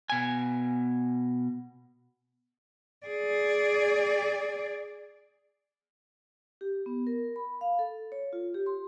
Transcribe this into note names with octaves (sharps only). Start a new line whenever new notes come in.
B2 G#5
G#4 D5
G4
B3
A#4
B5
F5
A4
C#5
F4
G4
C6